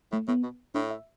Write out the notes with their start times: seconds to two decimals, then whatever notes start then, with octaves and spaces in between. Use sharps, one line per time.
0.12 A2 A3
0.28 A2 B3
0.43 B2
0.75 A2 D4
0.91 E5